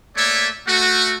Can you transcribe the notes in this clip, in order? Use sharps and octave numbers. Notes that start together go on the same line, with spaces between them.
A3 A#3 C#5 D5 E5
A3 F#4